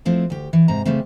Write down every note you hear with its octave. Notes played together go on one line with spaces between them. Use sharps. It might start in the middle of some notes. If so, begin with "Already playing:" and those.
F3 A3 C4 E4
D2 G4
E3
G#2 C3 A#5
C#3 G3 A3 C4